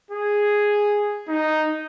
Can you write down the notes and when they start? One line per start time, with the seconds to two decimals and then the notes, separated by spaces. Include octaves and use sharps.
0.11 G#4
1.29 D#4